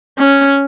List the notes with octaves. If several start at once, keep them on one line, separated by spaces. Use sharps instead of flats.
C#4